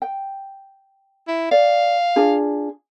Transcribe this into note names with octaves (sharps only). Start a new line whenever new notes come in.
G5
E4
D5 F5
D4 F4 G#4